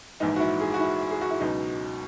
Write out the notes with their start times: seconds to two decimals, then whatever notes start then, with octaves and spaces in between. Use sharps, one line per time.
0.20 A#1 G#2 E3 D#4
0.36 F#4
0.40 E4
0.61 G#4
0.74 F#4
0.81 E4
1.11 G#4
1.21 F#4
1.31 E4
1.40 C#2 B2 F#3 D#4